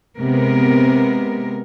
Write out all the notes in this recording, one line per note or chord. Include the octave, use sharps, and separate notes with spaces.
C3 G#3 B3 A#4